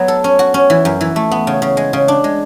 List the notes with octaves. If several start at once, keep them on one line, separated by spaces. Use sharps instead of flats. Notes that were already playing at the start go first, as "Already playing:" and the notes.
Already playing: F#3 B3
A4
C#4
F#4
C#4
E3
F#2
E3
A3
B3
C#3
C#3
G#3
C#3
D4
G#3